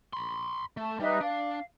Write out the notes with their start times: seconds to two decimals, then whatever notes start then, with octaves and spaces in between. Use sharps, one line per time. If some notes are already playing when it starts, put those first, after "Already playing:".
0.13 B5 C6
0.77 A3 A5
1.00 G3 D#4 B4 E5
1.21 D4 F5